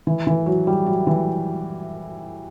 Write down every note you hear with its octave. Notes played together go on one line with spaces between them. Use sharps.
E3
E3
F#3
G3
F#3
E3